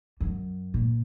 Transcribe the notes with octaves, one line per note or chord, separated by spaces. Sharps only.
F2
F#2
A#2